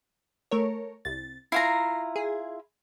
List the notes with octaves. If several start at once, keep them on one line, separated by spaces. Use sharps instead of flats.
A3 A#4 C#5
C2 A6
E4 F4 A#5 A#6 C7
G#4